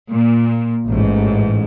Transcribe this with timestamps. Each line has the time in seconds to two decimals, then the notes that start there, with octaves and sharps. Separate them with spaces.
0.10 A#2
0.88 A1 G#2